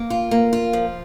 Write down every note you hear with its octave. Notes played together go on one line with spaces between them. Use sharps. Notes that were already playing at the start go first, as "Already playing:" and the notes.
Already playing: A#3
F4
A#3
F4
F3